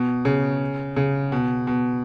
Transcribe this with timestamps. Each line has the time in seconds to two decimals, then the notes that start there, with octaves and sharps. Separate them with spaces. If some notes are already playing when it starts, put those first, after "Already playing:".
Already playing: B2
0.25 C#3
0.96 C#3
1.32 B2
1.67 B2